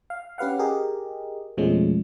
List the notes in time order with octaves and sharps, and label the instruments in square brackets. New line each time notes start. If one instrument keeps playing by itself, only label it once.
[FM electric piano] F5
C#4 G4 B4 F5 F#5
G4 G#4 A#4 D#5
F2 B2 F3 G#3 A3 C#4